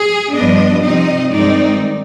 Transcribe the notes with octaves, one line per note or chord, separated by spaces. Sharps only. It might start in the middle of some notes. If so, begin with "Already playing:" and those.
Already playing: G#4
G2 F3 B3 D4 D#5
C3 F3 C4 D#4 D#5
G2 D#3 G#3 C4 D#4 D5